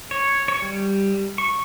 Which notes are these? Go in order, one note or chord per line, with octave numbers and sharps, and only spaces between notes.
C#5
C#5
G3
C#6